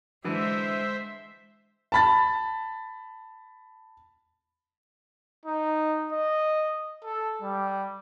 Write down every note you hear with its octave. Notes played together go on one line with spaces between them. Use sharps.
D3 E3 G#3 C5 E5
A5 B5 A6
D#4
D#5
A4
G3